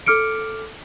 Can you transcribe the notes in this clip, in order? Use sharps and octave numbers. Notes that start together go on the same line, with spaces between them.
A4 D6 F6 C#7 D7